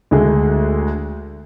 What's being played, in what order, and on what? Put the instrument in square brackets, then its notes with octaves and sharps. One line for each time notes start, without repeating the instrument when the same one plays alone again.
[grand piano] D2 D3 G#3